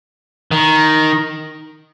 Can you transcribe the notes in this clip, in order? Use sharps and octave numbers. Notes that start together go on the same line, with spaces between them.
D#3